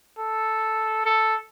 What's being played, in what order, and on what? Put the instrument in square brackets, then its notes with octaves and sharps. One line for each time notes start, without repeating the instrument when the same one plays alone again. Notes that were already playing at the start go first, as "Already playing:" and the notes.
[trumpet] A4
A4